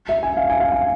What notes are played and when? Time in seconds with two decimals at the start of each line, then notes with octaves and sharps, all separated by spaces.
0.09 E5
0.23 G#5
0.37 F5
0.50 G#5
0.60 F5
0.72 G#5